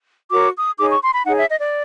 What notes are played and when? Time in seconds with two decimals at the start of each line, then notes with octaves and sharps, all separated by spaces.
0.31 F#4 A#4 C#5 D6
0.55 D#6
0.78 D#4 G#4 C#5 D6
0.90 C#6
1.02 C6
1.13 B5
1.25 D#4 G#4 C#5 F#5
1.37 E5
1.49 D#5
1.61 D5